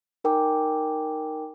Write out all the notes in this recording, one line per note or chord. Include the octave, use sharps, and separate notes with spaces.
D#4 A#4 G5 G#5 D6